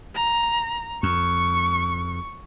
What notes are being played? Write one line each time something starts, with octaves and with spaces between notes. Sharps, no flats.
A#5
F2 C#6